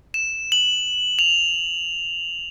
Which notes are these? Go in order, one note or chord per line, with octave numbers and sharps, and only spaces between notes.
E7
F#7
F7